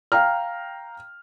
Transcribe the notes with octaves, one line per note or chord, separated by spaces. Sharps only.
F5 G5 A#5 F6